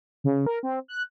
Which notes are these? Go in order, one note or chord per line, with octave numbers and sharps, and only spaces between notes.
C#3
A#4
C4
F#6